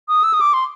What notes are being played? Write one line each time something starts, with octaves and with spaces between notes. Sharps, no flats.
D#6
E6
D#6
D6
C6